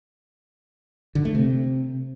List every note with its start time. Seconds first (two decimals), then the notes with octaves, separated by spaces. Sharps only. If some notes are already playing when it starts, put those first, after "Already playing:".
1.15 D3
1.25 A3
1.35 C3